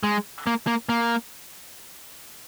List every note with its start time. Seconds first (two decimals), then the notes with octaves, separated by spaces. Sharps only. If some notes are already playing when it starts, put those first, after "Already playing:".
0.03 G#3
0.47 A#3
0.67 A#3
0.89 A#3